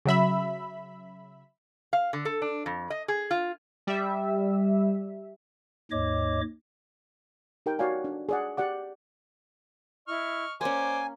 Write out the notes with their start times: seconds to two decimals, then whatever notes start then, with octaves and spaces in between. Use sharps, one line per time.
0.05 C#3 F#3 E5 B5
1.93 F5
2.13 D3
2.25 A4
2.42 D4
2.66 F2
2.90 D#5
3.08 G#4
3.31 F4
3.87 G3 E5
5.91 D#2 G#2 C#5 D#5 D6
7.66 D#4 G4 A#4 G5
7.79 F#4 C#5 D5 F5 G#5
8.04 D4
8.29 G#4 D5 F#5
8.57 G4 D5 F#5 D6
10.08 E4 D#5 C#6 F6
10.61 A#3 C#4 C5 D5 G#5 D6